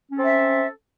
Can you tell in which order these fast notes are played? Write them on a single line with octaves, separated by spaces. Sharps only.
C#4 A4 C4 E5